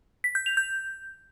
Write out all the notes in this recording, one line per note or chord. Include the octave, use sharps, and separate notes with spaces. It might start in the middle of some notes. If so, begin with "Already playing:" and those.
B6
G6
F7
G6